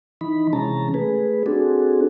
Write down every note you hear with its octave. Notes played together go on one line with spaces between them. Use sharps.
E3 D#4 B5
C3 E3 G#3 C#4 A5 A#5
A3 G#4 B4
C4 D4 F#4 G#4 A4